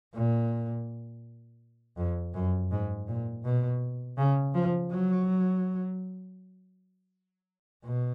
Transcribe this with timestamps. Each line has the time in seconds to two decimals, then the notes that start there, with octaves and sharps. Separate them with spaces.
0.14 A#2
1.97 F2
2.34 F#2
2.71 G#2
3.08 A#2
3.44 B2
4.18 C#3
4.54 F3
4.91 F#3
7.84 B2